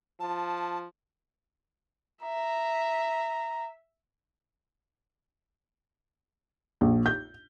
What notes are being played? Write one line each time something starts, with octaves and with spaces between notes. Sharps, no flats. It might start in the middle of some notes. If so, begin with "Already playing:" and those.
F3 A5
E5 A#5
A#1
G6